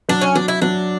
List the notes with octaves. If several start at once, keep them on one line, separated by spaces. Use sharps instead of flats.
F#3 D4
C#4
F#3 D4
E4
F#3 D4